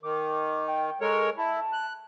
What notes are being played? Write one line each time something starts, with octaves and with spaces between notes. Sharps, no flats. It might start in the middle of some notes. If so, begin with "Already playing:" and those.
D#3 D6
G5
G#3 A4 A#4 C#5
E4 A5
F#6